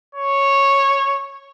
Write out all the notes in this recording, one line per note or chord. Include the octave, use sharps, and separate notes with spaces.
C#5